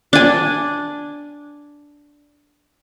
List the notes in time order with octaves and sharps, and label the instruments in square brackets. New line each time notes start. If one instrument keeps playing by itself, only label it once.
[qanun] D4 G#5